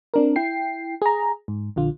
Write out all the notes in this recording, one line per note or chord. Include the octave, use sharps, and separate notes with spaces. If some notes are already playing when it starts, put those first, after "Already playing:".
C4 D4 A#4
E4 G5 C7
G#4 A#5
G#2
A#1 D3 F4